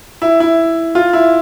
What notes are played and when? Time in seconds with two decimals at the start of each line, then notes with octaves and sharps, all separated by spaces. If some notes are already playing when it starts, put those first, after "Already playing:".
0.22 E4
0.40 E4
0.95 F4
1.13 E4